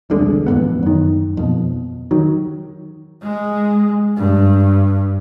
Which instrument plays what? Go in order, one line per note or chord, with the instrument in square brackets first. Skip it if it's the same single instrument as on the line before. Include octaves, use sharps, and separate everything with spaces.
[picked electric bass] E1 C2 D3 G#3
A1 F2 C3 B3
F#2 D#3
F2 B2
D#3 F#3
[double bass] G#3
G2